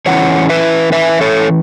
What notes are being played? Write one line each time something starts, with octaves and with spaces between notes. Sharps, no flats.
E3 C#4 E4 C#5 F#5
B4 E5
B4 E5
A4 C#5